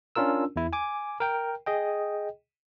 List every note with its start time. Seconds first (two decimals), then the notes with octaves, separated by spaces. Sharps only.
0.16 C#4 D4 F4 A#4 E6
0.56 E2 E4
0.73 G#5 D6
1.20 A#4 G5
1.66 G#4 D#5 G5